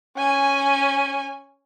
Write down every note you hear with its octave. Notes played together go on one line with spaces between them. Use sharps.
C#4 G#5